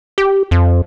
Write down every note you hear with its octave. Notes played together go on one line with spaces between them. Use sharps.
G4
F2